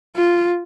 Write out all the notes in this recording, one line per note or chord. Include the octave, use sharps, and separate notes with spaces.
F4